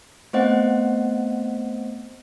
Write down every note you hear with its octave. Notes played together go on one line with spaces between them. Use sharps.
A3 B3 C4 C5 D#5 F#5